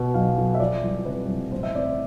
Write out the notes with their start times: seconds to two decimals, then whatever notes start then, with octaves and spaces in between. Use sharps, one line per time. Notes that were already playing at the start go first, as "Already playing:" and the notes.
Already playing: B2 B3
0.14 B1 F5
0.37 B1
0.54 E5
0.59 F3 D5
0.83 C2
1.05 C3 B4
1.28 C2
1.52 A1 C5
1.63 E5
1.75 C4 D5
1.86 C5